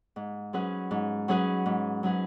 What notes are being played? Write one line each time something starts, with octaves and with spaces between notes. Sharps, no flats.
G#2
F#3 C#4 G#4 B4
G#2
F#3 C#4 G#4 B4
G#2
F#3 C#4 G#4 B4